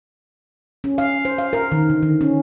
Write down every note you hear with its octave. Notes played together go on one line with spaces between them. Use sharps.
C#4
F5
C5
F5
A#4
D#3
D3
D#3
C#4